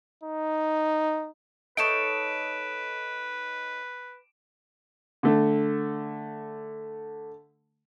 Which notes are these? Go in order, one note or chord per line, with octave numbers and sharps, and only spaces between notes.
D#4
D#4 A4 B4 C#5 D7 E7
D3 A3